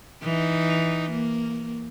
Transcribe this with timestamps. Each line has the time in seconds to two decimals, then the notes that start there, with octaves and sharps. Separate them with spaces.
0.23 E3 D#4
1.11 A#3